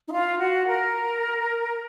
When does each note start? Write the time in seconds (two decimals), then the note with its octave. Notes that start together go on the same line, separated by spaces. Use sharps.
0.06 D#4
0.12 F4
0.38 F#4
0.66 A#4